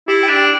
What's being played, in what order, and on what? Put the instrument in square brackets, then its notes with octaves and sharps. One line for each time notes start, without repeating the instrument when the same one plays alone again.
[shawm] E4 [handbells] G4
[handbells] G5
[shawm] D4
[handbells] G4